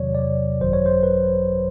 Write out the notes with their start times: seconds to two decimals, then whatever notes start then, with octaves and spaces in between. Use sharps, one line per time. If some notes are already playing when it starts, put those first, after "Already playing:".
Already playing: E2 C3 D#3 F#3 C#5 D5
0.15 D5
0.19 C#5
0.61 G#1 F#2 D#3 F#3 C5
0.73 C#5
0.86 C5
1.03 B4